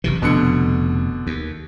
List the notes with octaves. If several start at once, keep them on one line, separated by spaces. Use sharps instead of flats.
F#1 C3 E3
F1 B2 D3 C#7
D#2